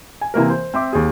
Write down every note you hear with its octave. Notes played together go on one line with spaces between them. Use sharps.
G#5
C3 E3 A#3 A#4
C5
C4 E5 D6
D#2 G#4